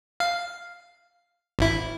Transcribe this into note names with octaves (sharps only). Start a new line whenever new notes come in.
F5
G#1 E4